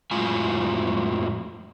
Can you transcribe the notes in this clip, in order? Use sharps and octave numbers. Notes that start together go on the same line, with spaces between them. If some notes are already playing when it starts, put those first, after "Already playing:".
F2 A2 F#3 G#3 F4 G#5